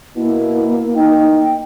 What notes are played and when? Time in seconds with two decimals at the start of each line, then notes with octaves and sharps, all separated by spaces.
0.16 B2 A#3 E4
0.96 D#4 G5